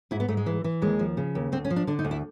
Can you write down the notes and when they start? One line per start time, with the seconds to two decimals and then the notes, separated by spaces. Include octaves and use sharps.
0.11 G#2 E4
0.20 B3
0.28 G#2 A3
0.37 G#3
0.46 E3
0.64 E3
0.82 D#2 G#3
0.99 F3
1.17 C#3
1.35 D#2
1.52 D2 C4
1.65 C#4
1.70 F3
1.76 D4
1.87 D3 D4
1.99 D#4
2.05 D2
2.11 E4